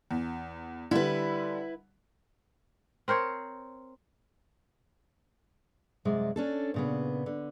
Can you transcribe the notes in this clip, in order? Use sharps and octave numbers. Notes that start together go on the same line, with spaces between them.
E2
D3 G3 E4 B4
C4 A#4 C5 C#5
F#2 C3 G#3 D5
C#4 D4 A4
A#2 C#3 B3
D3